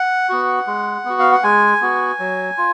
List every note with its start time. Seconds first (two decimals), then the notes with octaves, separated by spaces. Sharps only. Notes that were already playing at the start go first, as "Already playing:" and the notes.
Already playing: F#5
0.29 B3 F#4
0.67 G#3
1.05 B3 F#4
1.19 F5
1.32 F#5
1.43 G#3 G#5
1.81 B3 F#4
2.19 F#3
2.58 F4